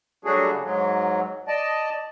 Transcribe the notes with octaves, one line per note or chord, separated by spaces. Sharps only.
F#3 G3 A3 D4 F#4 G#4
C#3
G#2 F#3
D5 D#5 A5